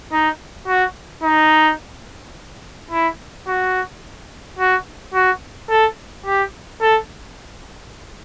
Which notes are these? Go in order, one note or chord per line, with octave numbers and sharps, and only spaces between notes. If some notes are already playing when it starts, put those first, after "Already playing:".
D#4
F#4
D#4
E4
F#4
F#4
F#4
A4
G4
A4